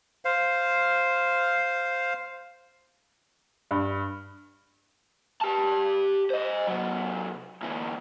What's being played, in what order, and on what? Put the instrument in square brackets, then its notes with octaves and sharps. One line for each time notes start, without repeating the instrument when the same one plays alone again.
[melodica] C5 F5
[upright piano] G2
[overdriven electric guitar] G4 A5
C5 D#5
C3 F#3
D2 E3